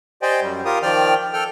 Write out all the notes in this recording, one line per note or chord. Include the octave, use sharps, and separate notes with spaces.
G4 C5 D5 D#5 G5 G#5
F#2 G3
F4 G4 A#4 D#6
D#3 F3 D5 G5 F6
A4 G5 F6